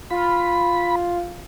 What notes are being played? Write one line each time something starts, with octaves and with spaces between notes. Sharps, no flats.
F4 B5